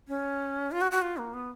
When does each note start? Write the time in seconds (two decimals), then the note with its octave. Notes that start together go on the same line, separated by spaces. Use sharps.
0.08 C#4
0.71 F4
0.81 F#4
0.91 F#4
1.02 F4
1.17 A#3
1.34 B3